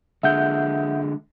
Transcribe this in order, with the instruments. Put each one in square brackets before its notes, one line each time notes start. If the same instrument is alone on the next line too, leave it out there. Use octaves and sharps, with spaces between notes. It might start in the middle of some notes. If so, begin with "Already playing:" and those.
[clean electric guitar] D3 G#3 [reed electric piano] E5 F#5 G6